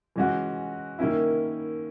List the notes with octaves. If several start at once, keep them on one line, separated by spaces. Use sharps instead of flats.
E3 G#3 C#4 F#4
D#3 A#3 C#4 E4